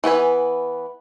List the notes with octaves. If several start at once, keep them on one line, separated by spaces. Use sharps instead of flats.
E3 B3 B4 G#5